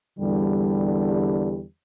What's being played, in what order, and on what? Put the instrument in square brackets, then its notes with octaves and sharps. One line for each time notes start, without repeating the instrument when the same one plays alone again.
[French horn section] E2 D3 G3